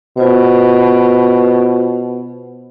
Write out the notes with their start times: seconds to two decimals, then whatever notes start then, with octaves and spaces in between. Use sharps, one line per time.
0.17 B2 F4 C5